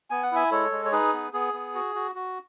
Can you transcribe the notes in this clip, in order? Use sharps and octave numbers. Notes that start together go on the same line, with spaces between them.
B3 G#5
F#5
E4 E5 G#5
G#3 A4 C#5
G#3
C#5
D#4 G#4 B4
B3
B3 G#4
B3
F#4
F#4
F#4